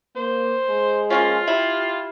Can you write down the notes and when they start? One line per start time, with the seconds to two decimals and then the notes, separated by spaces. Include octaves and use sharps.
0.16 A#3 C5
0.69 G#3
1.10 F3 A#3 C#4 F4
1.48 E4 G4